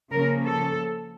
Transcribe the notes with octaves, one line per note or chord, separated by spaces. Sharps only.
C#3 F3 A#3 C#4 A#4
A4